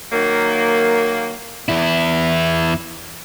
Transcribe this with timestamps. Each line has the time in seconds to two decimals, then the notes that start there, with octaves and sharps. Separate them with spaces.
0.12 D#3 F#3 A#3
1.69 E2 E4